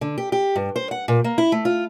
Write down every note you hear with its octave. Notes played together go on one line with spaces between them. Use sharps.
D3
G4
G4
G2
C5
F#5
A#2
A#3
E4
A3
F4